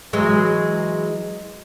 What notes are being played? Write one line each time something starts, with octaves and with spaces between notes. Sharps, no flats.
E3 F#3 G#3